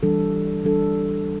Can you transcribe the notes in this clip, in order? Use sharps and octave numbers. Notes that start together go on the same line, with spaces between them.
E3 G3 D4 A4
E3 G3 D4 A4